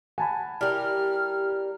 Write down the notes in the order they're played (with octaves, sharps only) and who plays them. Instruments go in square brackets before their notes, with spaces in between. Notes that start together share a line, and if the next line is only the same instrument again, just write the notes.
[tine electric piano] F#5 [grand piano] G#5 A5 B5
[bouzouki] G3 A#4 [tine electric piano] E4 G4 G5 [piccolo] F6